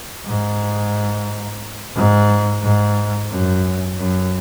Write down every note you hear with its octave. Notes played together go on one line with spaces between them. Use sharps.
G#2
G#2
G#2
F#2
F#2